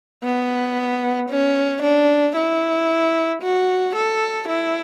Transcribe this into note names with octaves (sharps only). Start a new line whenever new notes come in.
B3
C#4
D4
E4
F#4
A4
E4